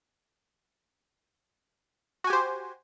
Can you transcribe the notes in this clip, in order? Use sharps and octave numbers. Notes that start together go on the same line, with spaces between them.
F#4 G4 C5 G#5